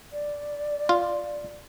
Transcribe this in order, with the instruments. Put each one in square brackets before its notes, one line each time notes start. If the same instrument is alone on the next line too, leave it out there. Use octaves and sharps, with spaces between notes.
[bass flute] D5
[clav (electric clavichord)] F4